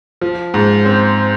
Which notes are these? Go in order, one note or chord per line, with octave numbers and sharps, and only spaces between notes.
F3
G#2
C4